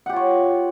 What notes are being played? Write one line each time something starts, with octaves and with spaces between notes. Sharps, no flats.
F4 G4 C#5 F#5